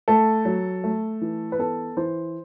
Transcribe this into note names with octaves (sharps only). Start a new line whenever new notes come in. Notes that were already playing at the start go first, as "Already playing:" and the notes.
A3 A4
F#3
A3
E3
B4
B3 A4
E3 C5